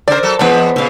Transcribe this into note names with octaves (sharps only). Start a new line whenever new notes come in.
C#3 A#4 C5 D5
F#3 A4
E3 G#3 B3 C4 D4 B4 B5
A#2 C#3 E5 F5